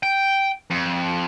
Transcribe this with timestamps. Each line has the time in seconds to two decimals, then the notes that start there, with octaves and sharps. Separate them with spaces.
0.03 G5
0.70 F2